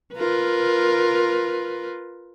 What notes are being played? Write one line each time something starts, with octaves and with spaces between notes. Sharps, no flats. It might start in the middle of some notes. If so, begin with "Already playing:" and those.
F4 A#4 B4